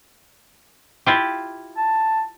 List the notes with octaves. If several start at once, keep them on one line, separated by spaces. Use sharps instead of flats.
E4 F4 G4
A5